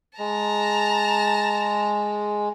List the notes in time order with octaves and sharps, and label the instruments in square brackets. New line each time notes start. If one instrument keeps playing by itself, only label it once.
[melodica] G#3 [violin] A5 A#5